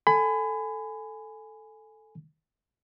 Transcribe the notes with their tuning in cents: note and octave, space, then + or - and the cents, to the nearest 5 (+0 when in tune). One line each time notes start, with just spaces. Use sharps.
A4 +0 G#5 +0 B5 +30